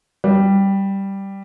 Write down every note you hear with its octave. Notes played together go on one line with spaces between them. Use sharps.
G3